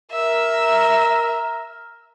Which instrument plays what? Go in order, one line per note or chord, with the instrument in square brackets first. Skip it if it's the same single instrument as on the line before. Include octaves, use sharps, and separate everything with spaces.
[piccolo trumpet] A#4 [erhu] E5